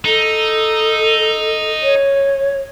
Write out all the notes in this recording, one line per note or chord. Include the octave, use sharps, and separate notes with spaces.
D#4 A4
C#5